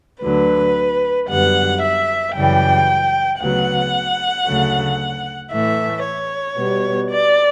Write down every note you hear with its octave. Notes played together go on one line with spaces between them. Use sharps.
D2 D3 F#3 B4
F#2 D3 G3 B3 F#5
E5
F#2 C#3 E3 G3 G5
D2 C#3 F#3 B3 F#5
D2 C#3 F#3 A3
A2 E3 A3 E5
C#5
B2 G3 B3
D5